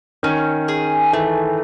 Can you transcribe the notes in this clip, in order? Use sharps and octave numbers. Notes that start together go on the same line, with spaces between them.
D#3 C#4
G#4
E3 A3